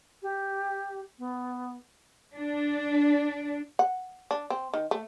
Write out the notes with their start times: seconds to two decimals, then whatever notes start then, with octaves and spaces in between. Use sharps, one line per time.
0.23 G4
1.19 B3
2.35 D4
3.79 F#5
4.31 D4
4.50 C4
4.74 D#3
4.91 A3